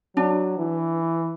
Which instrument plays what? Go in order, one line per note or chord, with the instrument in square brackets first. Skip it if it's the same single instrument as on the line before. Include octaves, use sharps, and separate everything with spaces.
[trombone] F#3 [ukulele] D4
[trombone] E3